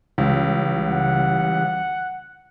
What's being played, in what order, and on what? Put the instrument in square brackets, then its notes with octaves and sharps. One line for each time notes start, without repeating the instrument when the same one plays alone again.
[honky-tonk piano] C#2 [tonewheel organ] C#3 E3 G3
[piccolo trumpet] F#5